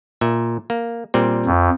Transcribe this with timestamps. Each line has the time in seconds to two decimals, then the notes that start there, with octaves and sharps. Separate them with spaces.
0.21 A#2 E5
0.70 A#3
1.14 A#2 G3 C4
1.46 F2